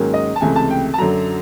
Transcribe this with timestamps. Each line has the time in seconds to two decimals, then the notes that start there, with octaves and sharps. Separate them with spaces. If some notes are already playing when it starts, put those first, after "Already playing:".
Already playing: G#2 D#3 F#3 A#3 C#4
0.14 D#5
0.36 A5
0.41 C#2 C3 E3 A3 G#5
0.56 A5
0.70 G5
0.94 A5
0.98 F#2 D3 F#3 A#5